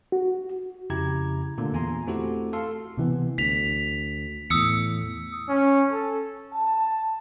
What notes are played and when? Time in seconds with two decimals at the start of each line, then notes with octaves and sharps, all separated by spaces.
0.12 F#4
0.90 F2 C#3 E4 G4 A#5 G#6
1.58 A#2 D3 A3 A#3
1.73 E2 F4 G#5 A#5 C6
2.07 A3 C4 E4 F#4 G4 A4
2.53 F#4 A4 F5 C6
2.97 C3 E3 B3
3.38 D2 B6 F7
4.50 E2 A2 D#6 E6 C#7
5.49 C#4
5.92 A4
6.52 A5